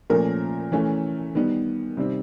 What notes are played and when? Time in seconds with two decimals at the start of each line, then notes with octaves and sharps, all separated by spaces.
0.10 A#2 F3 A3 C#4 A#4
0.72 E3 A3 C#4
1.35 D#3 G3 B3
1.97 C3 D#3 G3 C4